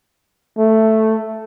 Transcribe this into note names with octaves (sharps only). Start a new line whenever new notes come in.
A3